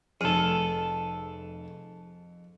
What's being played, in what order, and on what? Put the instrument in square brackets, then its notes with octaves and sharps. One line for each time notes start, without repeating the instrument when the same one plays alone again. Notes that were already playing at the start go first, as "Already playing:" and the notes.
[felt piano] F1 F6 [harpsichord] F2 [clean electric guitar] G#4 A4